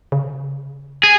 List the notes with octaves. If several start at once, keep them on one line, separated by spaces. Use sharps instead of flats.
C#3
G#4 G#5